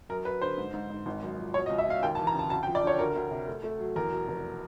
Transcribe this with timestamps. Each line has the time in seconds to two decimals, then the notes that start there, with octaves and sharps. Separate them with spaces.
0.09 F#2 A#4
0.25 F#3 B4
0.41 D3 C5
0.58 G#2
0.74 G#2
0.90 G#2
1.06 G#1
1.22 F#2
1.38 F3
1.54 B2 C#5
1.66 D#5
1.70 C#2
1.78 E5
1.86 B2 F5
2.02 D#2 G5
2.15 A5
2.19 E3
2.27 A#5
2.34 C#3 A5
2.50 D2 A5
2.63 G5
2.67 F3
2.75 D5
2.83 D3 C#5
2.99 D2 A#4
3.16 D2
3.31 C3
3.48 A3
3.64 A3
3.80 F#3
3.96 E2 A#4
4.12 B2
4.28 F1